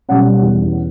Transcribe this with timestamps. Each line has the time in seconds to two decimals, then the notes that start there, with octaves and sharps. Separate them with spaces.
0.09 B2 G3 C#4 F#5
0.43 E2